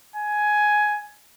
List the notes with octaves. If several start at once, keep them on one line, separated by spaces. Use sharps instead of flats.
G#5